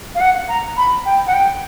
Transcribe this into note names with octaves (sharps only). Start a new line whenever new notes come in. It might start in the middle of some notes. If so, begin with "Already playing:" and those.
F5
F#5
A#5
B5
G5
F#5
G5